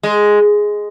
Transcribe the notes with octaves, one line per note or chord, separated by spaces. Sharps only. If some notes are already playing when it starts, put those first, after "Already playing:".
G#3